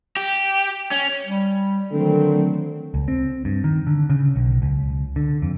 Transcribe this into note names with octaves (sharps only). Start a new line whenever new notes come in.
G4
C#4
G3
D3 D#3 F#3 A3 C4
C#2
C4
G2
D#3
D3
C#3
B1
C#2
D3
F2